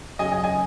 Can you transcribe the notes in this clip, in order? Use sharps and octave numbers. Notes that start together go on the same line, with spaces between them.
F#2 C#3 F#3 D#5 G#5
D#5 G#5
D#5 G#5